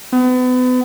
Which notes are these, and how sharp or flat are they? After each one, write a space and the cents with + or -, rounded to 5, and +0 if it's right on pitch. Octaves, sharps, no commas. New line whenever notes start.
B3 +35